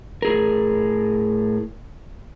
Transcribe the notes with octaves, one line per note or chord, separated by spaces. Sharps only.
A2 G#4 A#4